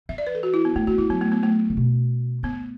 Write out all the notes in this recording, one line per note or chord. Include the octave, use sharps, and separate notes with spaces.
E3 E5
D5
B4
A4
F#4
E4
B3
A3 D4
B3 F#4
B3 E4
F#3 B3
A3
B3
A3
D3
B2
A3 B3